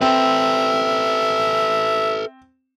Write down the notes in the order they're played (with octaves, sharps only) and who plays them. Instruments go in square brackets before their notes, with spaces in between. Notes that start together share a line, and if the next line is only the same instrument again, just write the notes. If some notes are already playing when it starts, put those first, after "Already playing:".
[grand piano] C4 [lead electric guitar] A4 B4 [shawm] E5